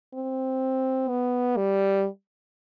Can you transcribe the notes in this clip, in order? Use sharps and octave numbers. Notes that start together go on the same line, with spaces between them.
C4
B3
G3